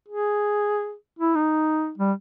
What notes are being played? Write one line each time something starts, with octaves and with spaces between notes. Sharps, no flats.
G#4
E4
D#4
G3